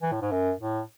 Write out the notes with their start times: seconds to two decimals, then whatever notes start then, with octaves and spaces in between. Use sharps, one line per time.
0.02 E3
0.12 A2
0.22 G#2
0.32 F#2
0.60 A2